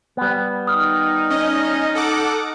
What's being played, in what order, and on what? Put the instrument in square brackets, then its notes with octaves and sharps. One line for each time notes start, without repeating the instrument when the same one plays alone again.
[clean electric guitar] G3 B3
[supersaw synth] D#4 [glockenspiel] D#6 F6
[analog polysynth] C#4 D#5
A4 F#5 D6